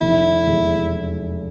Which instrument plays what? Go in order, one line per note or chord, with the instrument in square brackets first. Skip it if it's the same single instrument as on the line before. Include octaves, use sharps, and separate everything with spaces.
[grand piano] F1 [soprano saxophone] E4
[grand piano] E2 B2 G#3